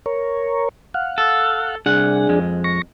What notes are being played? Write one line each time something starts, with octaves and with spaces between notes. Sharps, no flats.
A#4 C#5
F5 F#5
A4
C2 D4 G#4 F#5
F2 G#3
C#6 A#6